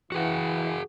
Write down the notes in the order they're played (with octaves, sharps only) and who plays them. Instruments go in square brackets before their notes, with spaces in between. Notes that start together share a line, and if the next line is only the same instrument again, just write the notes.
[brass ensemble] E3 [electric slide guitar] F#4 G#4 F#5